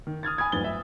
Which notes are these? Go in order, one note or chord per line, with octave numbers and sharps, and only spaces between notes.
D#3
D#6 F6 G#6 A6
G#5 B5 D#6 G#6
D1 G1 B4 A6 G7
E5